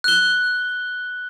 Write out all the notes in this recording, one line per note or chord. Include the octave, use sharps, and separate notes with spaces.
F#6 G7